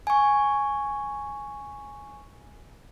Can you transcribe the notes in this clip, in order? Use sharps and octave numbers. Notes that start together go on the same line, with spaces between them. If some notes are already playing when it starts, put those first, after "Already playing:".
G#5 C#6